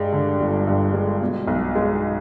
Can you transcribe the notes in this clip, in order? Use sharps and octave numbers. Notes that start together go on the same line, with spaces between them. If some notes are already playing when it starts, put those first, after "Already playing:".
Already playing: G2 G#3
D3
G1
G2
G#3
B2
B1
G#3